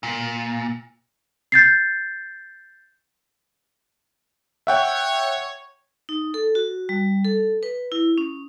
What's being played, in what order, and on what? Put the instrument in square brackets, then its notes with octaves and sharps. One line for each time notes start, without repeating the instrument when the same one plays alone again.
[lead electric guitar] A#2
[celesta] G6 A6 C7
[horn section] C#5 [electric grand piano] E5 F#5 G5
[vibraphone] D#4
A4
F#4
G3
A4
B4
E4
C#4